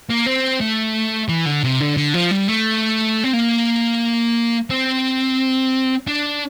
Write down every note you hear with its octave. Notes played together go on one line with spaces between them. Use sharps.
A#3
C4
A3
E3
D3
C3
D3
D3
F3
G3
A3
C4
A#3
C4
D4